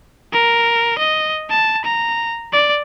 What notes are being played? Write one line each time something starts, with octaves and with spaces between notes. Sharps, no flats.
A#4
D#5
A5
A#5
D5